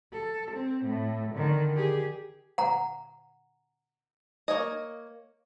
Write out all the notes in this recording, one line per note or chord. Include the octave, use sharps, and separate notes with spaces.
A4
C4
A2
D3 D#3
G4 G#4
F#5 A#5
A#3 C#5 D#5